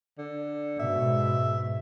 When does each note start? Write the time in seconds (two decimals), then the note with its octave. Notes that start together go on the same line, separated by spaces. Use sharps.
0.18 D3
0.79 G#2 B2 E5